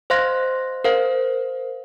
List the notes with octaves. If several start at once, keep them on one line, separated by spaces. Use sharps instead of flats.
C5 D#5 F5 C6 F#6 A#6
A#4 C5 F5